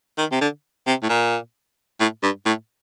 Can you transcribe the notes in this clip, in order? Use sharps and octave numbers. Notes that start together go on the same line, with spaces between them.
D#3
C3
D3
C3
A2
A#2
A2
G2
A2